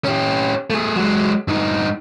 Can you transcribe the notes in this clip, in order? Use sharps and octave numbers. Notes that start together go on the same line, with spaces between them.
C#4 G4
A3 G#4
F#3 G#3
G2 D#4